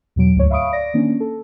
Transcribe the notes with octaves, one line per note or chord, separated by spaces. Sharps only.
E2 B2 F#3 D7
D2 G#2 C#5
E5 F5 B5 C#6 D#6 D7
D5 A#6 D7
D#3 A#3 C#4 D4
A4